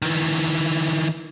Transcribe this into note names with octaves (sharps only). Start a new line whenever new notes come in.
D#3 E3